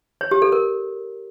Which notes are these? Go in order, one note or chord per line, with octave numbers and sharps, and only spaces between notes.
C#5
G4
A4
A#4